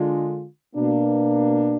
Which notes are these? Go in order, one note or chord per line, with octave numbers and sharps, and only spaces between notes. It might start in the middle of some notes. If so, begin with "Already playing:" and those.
Already playing: D3 G#3 D4 F4
B2 A#3 D4